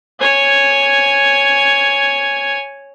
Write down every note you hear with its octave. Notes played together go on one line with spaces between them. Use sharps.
C#5 G#5